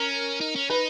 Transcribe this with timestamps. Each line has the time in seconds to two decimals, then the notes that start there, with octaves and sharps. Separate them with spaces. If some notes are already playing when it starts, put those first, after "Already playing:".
Already playing: C#4 A#4
0.41 D#4
0.56 C#4
0.70 D#4 B4